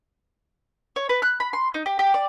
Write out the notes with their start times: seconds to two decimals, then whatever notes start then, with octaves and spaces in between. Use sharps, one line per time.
0.96 C#5
1.09 B4
1.22 F#6
1.40 B5
1.53 C6
1.74 D#4
1.86 G4
1.99 G4
2.14 D5